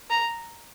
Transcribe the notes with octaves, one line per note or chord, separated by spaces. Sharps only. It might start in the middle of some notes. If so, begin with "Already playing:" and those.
A#5